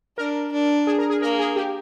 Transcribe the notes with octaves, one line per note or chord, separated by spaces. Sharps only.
D4 A#4
D4
G#4
A#4
G#4
A#3 A#4
G#4
G4